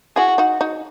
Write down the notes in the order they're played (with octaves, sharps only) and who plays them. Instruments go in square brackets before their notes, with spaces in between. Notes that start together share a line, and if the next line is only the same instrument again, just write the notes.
[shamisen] E4 G#4 [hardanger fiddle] F#4
[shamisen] D#4 F#4
D#4 F#4